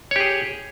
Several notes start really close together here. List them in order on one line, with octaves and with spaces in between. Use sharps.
C#5 G4 G#4